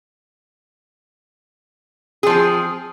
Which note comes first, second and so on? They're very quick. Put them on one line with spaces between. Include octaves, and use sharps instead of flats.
G#4 F3 C4